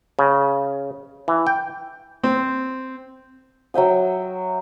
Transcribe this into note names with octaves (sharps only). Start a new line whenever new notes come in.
C#3
E3
G5
C4
F#3 E5 G5 D#6